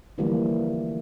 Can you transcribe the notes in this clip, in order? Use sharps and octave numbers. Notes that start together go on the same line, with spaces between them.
D3 E3 F3 G3 A3 A#3